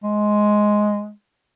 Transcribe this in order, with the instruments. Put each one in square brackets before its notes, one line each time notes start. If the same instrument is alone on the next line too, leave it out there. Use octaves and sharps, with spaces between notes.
[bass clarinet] G#3